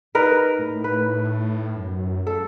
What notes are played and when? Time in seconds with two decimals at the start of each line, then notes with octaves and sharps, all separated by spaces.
0.15 D#4 A#4 B4
0.59 A2
0.84 B4
1.76 F#2
2.27 A4